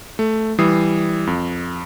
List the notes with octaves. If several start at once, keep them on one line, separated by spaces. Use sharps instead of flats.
A3
E3 G3 D#6 C7
F2